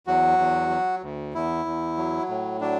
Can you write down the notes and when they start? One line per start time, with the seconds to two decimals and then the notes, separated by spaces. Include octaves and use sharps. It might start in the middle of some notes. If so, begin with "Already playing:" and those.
0.07 E2 F#3 F#4
0.38 E2
0.70 F#3
1.02 D2
1.34 E2 E4
1.66 E2
1.97 F#3
2.28 A2
2.61 F#3 D4